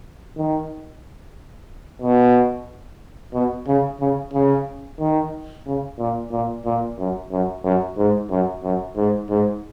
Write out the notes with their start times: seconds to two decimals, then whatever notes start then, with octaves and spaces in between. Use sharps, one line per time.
0.37 D#3
2.02 B2
3.34 B2
3.67 C#3
4.01 C#3
4.33 C#3
5.00 D#3
5.66 C#3
5.99 A#2
6.31 A#2
6.65 A#2
6.99 F#2
7.31 F#2
7.64 F#2
7.97 G#2
8.30 F#2
8.63 F#2
8.96 G#2
9.29 G#2